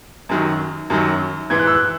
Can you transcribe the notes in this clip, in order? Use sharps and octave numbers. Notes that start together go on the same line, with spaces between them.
F#2 D#3 F#3
F#2 D#3 F#3
G#2 E3 G#6
F#6
E6
F#6